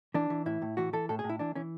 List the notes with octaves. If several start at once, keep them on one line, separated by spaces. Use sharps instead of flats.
E3 D4
E3
A2 E4
A2
E3 F#4
E3 A4
A2 A4
G#4
A2
E4
E3 D4
E3 C#4